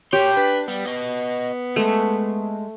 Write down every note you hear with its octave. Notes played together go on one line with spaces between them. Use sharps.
G4 A#4 C#5 C6
D4 B4
G3 B3
F#4 D#5
G#3 A3